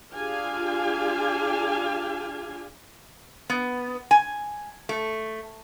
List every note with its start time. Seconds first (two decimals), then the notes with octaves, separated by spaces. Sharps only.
0.13 D4 F4 G4 G#4 F5 G#5
3.50 B3
4.11 G#5
4.89 A3